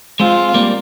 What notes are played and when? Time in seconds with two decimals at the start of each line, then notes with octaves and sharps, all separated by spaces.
0.20 G#3 C4 F4
0.54 G3 A#3